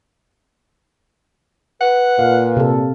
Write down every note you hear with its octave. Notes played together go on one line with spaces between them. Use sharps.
B4 F#5
A#2 F5
C3 A4